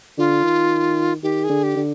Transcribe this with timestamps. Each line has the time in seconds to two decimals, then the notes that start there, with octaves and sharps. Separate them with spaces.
0.18 D3 F4
0.44 D#3
1.23 D#3 G4
1.44 G#4
1.50 D3
1.63 G4
1.76 D3